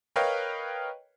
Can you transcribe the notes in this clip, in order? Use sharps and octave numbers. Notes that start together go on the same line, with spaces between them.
A#4 B4 C#5 D#5 F5 G5